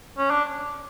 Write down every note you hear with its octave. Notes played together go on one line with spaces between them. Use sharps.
C#4
D4